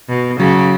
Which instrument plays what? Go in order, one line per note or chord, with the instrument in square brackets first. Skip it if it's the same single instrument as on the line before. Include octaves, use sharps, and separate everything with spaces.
[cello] B2
[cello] C#3 [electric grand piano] F#3